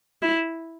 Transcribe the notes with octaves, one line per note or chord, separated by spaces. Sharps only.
E4